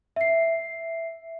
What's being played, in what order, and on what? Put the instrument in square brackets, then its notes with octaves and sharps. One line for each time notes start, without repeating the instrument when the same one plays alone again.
[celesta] E5 C7